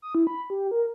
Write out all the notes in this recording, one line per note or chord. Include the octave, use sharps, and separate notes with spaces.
D#6
E4
B5
G4
A#4